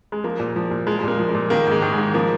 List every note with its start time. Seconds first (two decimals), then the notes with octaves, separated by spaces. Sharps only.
0.12 G#3
0.24 F3 A#3
0.40 A#2
0.56 F3
0.71 A#2
0.87 F3 G#3
0.99 G#3
1.03 A#2 A#3
1.19 F3
1.29 G#3
1.35 A#2
1.50 D#3 A#3
1.67 G#2 G#3
1.82 D#3
1.93 G#3
1.98 G#2
2.14 F3 A#3